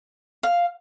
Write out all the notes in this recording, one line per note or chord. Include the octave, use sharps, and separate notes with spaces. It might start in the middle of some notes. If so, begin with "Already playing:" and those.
F5